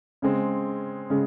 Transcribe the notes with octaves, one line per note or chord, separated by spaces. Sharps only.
C#3 G#3 C4
C#3 G#3